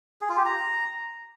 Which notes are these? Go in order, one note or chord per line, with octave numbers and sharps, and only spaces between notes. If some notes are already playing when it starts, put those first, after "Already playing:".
G#4
F4
G4
A#5